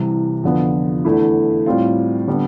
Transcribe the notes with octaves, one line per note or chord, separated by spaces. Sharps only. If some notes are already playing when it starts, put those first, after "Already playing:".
Already playing: C2 C3 E3
F2 D3 F3 B3
E2 D3 A3 E4
A2 G3 C4 F4
D3 G3 B3 D4